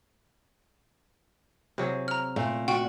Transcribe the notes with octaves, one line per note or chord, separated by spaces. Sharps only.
C3 F#3 G#4
A#5 F6
A#2 A3
F#4 G5